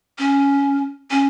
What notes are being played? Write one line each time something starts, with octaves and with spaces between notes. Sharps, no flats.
C#4
C#4